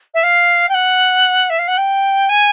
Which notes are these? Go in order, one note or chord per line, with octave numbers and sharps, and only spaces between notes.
E5
F5
G5
F#5
E5
F5
F#5
G5
G#5